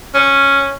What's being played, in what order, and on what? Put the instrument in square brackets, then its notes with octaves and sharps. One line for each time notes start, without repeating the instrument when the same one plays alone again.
[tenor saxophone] C#4